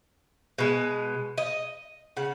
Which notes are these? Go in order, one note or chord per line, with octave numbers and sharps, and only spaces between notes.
B2 G#3
D#5
C#3 F#5